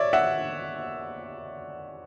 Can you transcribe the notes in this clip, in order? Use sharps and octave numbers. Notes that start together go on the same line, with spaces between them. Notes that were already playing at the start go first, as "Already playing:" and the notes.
Already playing: C#5 D5 E5
E5 F#5